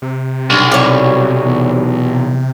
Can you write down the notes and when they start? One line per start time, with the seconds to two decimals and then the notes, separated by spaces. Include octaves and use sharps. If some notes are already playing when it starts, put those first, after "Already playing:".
0.02 C3
0.50 B1 G2
0.71 C2 G3 C#5
1.46 E2